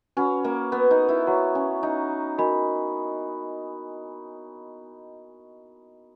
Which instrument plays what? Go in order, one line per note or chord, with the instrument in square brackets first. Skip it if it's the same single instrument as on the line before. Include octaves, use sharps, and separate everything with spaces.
[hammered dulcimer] C#4 [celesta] F#4 B4 F#5 B5
[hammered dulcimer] A#3
B3
D#4
E4
[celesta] F#4 C#5 F#5 A#5 C#6
[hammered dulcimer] C#4
D#4
[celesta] F#4 A#4 D#5 G#5 B5